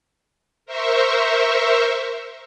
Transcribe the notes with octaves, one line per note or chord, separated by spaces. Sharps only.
A#4 C5 E5 C#6